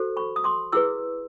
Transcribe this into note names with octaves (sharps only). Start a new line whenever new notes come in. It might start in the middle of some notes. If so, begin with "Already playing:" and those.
Already playing: F#4 A4 C5
B5 C#6
D#6
C6 D6
E4 G#4 B4 D6 E6